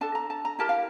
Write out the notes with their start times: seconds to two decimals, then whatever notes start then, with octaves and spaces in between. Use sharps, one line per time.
0.01 D4 A4 A5
0.15 A#5
0.30 A5
0.45 A#5
0.59 E4 G4 A#4 A5
0.69 F5